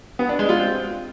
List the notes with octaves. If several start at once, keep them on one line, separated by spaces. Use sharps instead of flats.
B3
D4
G#3
F4
C4